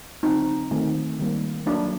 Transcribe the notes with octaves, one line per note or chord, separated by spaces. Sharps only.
D3 F#3 C4 D#4
D#3 A3 C4
D#3 G3 A#3
F#3 A#3 D4